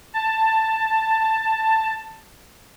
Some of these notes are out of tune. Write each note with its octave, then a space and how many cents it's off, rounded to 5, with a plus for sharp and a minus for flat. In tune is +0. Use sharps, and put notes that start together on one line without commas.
A5 +10